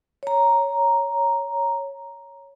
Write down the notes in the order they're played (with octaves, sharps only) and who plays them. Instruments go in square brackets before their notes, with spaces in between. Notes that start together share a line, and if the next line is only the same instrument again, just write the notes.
[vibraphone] C#5 A#5